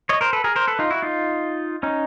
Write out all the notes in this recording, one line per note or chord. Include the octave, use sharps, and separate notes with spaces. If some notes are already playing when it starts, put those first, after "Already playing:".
C#5 D#5
A#4 C5
A4 B4
G#4 A#4
A#4 C5
A4 B4
D#4 F4
E4 F#4
D#4 F4
C#4 D#4